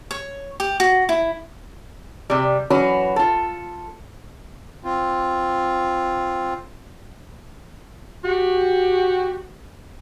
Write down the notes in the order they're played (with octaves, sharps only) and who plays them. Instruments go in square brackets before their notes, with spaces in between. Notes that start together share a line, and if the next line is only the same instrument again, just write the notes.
[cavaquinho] C#5
G4
F#4
E4
[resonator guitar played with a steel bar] C3 G3
E3 F#3 C#4 F#4 B4
F4 A4
[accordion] C4 F4
[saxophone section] F#4 G4